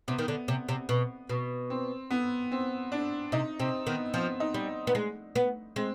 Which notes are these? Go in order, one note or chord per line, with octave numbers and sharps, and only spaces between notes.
C3 B3
D#3
D3
C3
C3
B2
B2
C4
B3
C4
D4
C3 D#4
C3 C4
D#3 B3
F3 C4
D#4
G3
B3
G#3
B3
G#3 C4